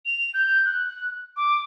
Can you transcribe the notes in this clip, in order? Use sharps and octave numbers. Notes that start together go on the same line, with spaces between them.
F7
G6
F#6
D6